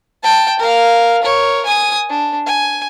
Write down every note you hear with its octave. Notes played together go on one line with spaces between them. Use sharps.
G5 A5
A#4 F5
A#4 C#5
G#5 D#6
D4
G#5